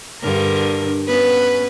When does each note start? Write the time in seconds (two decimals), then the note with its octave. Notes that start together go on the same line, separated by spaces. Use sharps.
0.21 G2 D3 A#4
1.08 B3 C#4 B4